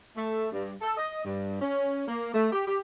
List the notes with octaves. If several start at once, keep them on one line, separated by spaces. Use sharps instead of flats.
A3
G2
A4
D#5
G2
C#4
A#3
A3
G4
G4